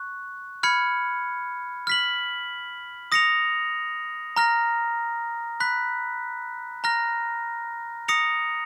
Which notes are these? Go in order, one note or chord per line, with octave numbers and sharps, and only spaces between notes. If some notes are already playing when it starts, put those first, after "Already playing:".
Already playing: C#6 F#6
B5 F6 G#6 C#7
F6 B6 F#7
D#6 A#6 C#7 F7
A#5 F6 A#6
B5 F#6 B6
A#5 F6 A#6
D#6 A#6 C#7 F7